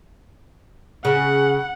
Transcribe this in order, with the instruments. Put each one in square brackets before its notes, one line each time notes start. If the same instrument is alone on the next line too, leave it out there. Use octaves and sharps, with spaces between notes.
[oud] C#3 [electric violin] F#5